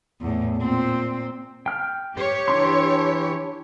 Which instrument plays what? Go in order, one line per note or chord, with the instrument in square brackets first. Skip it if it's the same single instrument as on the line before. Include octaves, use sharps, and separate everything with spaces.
[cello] E2 A2
A#2 C4
[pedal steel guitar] G5 F6
[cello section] G4 C#5
[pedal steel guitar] E3 D4 C6